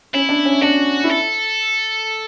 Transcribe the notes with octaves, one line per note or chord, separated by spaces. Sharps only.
C#4 E4
D4
C#4
D4 F#4
E4
A4